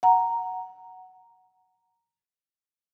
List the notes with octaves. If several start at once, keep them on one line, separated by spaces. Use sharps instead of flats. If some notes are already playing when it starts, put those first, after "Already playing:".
F#5 A#5